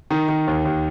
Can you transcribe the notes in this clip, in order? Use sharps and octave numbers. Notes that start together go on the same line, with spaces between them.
D#3 D#4
D#3
D#2
D#2